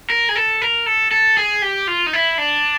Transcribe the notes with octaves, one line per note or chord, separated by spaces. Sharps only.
A#4
G#4
A4
A#4
A4
A4
G#4
G4
F4
D#4
E4
D4